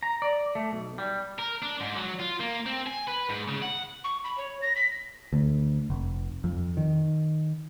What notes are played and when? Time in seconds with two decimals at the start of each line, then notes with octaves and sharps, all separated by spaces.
0.03 A#5
0.22 D5
0.55 A3
0.72 B1
0.98 G3
1.39 A#4
1.62 D4
1.81 G#2
1.95 F#3
2.19 F4
2.40 A#3
2.66 C4
2.87 G#5
3.08 B4
3.30 G#2
3.48 C#3
3.62 F#5
4.04 C#6
4.24 B5
4.38 C#5
4.62 A#6
4.76 B6
5.33 D2
5.90 F1
6.44 F2
6.77 D#3